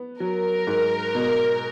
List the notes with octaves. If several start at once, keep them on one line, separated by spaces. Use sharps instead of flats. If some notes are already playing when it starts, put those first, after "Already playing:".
Already playing: B3
F#3 A#4
G#2
B2